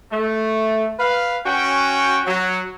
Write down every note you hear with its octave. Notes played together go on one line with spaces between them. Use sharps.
A3
B4 F5
C#4 F#4 G5
F#3